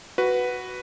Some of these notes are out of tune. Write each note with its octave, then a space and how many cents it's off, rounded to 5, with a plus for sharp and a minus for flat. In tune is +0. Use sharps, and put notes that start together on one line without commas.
F#4 +0 B4 +0